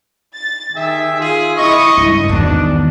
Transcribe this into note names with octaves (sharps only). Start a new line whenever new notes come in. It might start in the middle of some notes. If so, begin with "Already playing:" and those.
A6
D#3 G4 G#4 E5
F4 G#4
E4 D#5 C#6 D#6
C#2 G2
E2 G#2 B2 D#3 D4